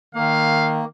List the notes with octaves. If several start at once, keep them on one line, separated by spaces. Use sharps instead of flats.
D#3 A#3 F5